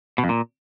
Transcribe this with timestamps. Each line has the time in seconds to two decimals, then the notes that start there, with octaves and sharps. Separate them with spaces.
0.18 B2
0.24 F2
0.29 A#2